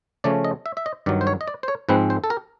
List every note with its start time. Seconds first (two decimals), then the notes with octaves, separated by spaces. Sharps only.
0.24 C#3 F3 A3 C#4 D5
0.44 D#5
0.66 E5
0.77 E5
0.86 D#5
1.06 G2 D#3 F#3 D5
1.21 C5
1.27 C#5
1.41 D#5
1.48 D5
1.63 C5
1.68 C#5
1.89 G#2 F3 G#3 C4 B4
2.10 C5
2.24 A4
2.30 A#4